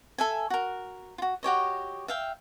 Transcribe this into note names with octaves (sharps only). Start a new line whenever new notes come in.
A4 E5 G#5
F#4 A#4
F4 F#4
F#4 G4 C#5 D#5
E5 F5 G5